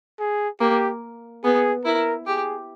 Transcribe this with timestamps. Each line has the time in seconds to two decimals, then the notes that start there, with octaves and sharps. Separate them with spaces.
0.19 G#4
0.60 A#3 G4
1.44 B3 G#4
1.85 E4 A#4
2.27 G4 G#4